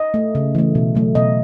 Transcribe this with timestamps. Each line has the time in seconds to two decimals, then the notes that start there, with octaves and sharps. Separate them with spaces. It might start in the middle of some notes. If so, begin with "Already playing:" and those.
Already playing: D#5
0.14 A3
0.35 C#3
0.55 E3 A3
0.75 B2
0.95 F#3 A3
1.15 B2 D#5